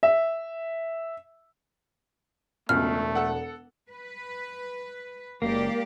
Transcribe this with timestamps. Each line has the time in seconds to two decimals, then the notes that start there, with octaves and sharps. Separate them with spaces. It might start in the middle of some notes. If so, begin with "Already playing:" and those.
0.03 E5
2.69 E1 C#2 B2 A3 F6
3.15 A4 F#5
3.90 B4
5.42 F#1 G#3 A#3 G4 D5